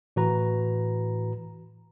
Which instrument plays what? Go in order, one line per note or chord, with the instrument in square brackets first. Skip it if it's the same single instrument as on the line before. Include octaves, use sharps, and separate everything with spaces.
[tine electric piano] A2 E3 F#4 B4 A#5